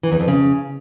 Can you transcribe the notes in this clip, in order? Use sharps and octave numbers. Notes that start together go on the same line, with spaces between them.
E3
E2
F2
C#3